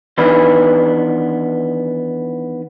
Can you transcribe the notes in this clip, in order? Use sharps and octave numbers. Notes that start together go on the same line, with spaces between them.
D#3 E3 B3 D4 B4